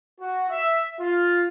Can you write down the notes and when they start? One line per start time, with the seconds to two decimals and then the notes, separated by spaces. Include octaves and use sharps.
0.20 F#4
0.50 E5
0.99 F4